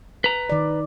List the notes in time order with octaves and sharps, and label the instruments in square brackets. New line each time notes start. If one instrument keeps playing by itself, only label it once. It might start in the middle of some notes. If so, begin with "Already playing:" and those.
[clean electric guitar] B4 A#5
[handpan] D#3 D5